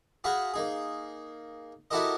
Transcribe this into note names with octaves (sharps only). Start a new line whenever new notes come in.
F#4 G#4 F5 B5 C#6
A#3 D#4 G#4
E4 F#4 G4 A4 A#4 D#5